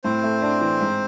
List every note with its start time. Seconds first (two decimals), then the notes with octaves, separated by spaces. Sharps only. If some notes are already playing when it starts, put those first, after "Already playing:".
0.04 A2 C4 C5
0.23 A3
0.42 D4
0.61 E3
0.80 G#2